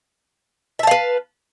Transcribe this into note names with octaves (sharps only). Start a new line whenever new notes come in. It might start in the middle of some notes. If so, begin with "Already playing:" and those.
B4 E5 F5 A5